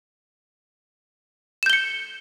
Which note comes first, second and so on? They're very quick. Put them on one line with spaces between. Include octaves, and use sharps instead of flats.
E7 G6 G7 C#7